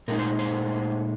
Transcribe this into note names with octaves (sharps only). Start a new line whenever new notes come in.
A#2 G#3 D#4 A#4
C5
C5